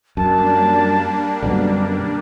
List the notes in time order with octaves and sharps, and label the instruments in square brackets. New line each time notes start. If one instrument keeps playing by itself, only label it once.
[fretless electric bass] F#2 [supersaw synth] G3 A#3 D4 [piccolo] A5
[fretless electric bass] F#2 B2 D3